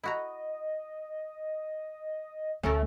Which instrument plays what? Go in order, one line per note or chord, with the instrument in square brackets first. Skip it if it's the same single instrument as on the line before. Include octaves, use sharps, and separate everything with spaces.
[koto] E4 F#4 A#5 [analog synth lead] D#5
[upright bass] D2 [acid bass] A3 [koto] C#4 A4 A#4